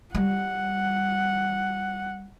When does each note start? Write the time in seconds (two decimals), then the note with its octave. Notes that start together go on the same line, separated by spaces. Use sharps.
0.15 G3 F#5